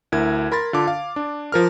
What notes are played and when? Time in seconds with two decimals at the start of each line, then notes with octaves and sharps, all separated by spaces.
0.12 D2 E4 A#4 G#6
0.52 A#4 B5 C6 A6
0.73 D3 F4 A5 D6
0.87 F5
1.16 D4
1.52 F3 A#4 F6